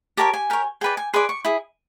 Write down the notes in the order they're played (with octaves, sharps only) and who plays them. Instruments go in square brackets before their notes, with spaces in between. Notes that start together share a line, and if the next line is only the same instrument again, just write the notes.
[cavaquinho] G4 A#4 C#5 A5
G#5
G4 A#4 C#5
G#4 B4 D5 G5
G#5
G#4 B4 D5 C6
C#6
E4 G#4